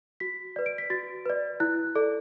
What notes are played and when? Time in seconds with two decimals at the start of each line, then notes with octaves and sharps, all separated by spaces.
0.20 F#4 B6
0.56 B4 D5
0.66 D7
0.78 B6
0.90 F#4 A6
1.26 B4 D5
1.60 E4 F#6
1.95 A4 D5